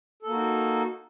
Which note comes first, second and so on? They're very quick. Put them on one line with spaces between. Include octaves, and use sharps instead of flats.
A4 A#3 F#4 D#4